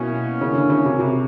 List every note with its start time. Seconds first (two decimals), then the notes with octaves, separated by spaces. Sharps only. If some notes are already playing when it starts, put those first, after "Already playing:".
Already playing: B2 F#3 A#3 C#4 E4
0.41 C#3
0.55 D3
0.70 C#3
0.86 C3
1.00 C3